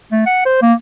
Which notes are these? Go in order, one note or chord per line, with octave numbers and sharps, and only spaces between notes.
A3
F#5
C5
A#3